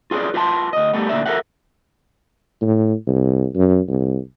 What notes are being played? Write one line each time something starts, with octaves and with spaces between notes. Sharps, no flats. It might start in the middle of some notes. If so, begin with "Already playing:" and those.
F4 G#4 A#4 B4 D5
F4 B4 E5 A5 C6
D2 D#5
G3 A3 B3
D2 A#2 D3 D5 E5
A4 A#4 E5 F#5
A2
C2
F#2
C2